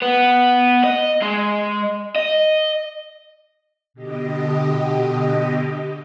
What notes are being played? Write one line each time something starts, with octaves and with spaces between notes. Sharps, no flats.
B3
D#5
G#3
D#5
B2 D3 G4 D#5